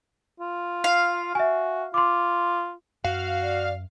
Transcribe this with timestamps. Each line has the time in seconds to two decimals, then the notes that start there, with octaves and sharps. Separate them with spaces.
0.40 F4
0.84 F5
1.35 F#4 E5 G#5
1.94 F4 C6 D6
3.04 F#2 F#4 F5
3.42 D5